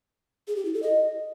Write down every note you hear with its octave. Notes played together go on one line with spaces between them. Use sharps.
G#4
G4
E4
A4
D#5